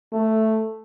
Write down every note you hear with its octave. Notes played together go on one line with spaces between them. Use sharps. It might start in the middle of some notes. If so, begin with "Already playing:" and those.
A3